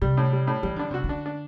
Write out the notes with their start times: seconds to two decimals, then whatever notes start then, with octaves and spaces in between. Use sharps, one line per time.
0.02 C3 G3
0.17 A2
0.33 G3
0.47 A2
0.63 E3 G3
0.76 D3 D4
0.91 C3 F#4
1.04 D3
1.09 D4
1.26 D4